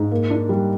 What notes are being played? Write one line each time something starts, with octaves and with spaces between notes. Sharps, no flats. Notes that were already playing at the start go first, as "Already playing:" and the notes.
Already playing: G#2
A#3
D4
G3